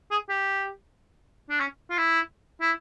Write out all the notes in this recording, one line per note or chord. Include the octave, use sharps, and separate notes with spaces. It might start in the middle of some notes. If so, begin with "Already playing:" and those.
G#4
G4
D4
C#4
F4
E4
E4